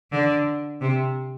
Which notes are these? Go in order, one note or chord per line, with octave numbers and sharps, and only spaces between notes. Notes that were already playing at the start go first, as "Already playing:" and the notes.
D3
C3